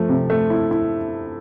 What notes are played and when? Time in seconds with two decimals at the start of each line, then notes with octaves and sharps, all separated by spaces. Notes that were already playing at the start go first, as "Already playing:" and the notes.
Already playing: F3 A3
0.09 C3
0.30 A3
0.50 E4
0.71 E4